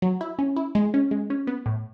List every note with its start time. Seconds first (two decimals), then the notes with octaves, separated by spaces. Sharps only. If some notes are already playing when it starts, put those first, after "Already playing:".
0.02 F#3
0.21 E4
0.39 C#4
0.56 E4
0.75 G#3
0.94 C#4
1.11 G#3
1.30 C#4
1.47 B3
1.66 A2